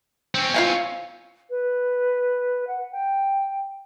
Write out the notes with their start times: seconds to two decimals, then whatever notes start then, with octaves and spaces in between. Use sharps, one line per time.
0.35 C4 C#4
0.54 F4 F5 G#5
1.50 B4
2.67 F#5
2.92 G5